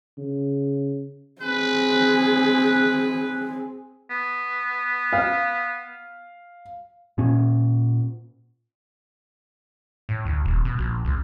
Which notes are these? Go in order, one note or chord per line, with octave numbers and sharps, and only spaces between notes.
C#3
C4 G#4 B4
B3
F5
A#2 C#4
A2
D2
D#1
B2
A#1
C#2